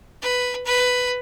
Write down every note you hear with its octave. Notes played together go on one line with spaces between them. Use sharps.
B4
B4